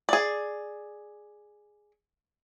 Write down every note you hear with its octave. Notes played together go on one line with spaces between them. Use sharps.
G#4 D5